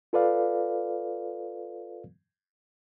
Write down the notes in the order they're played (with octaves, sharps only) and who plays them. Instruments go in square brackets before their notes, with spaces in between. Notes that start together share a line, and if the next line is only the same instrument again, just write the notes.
[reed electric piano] F4 A4 B4 D5 F5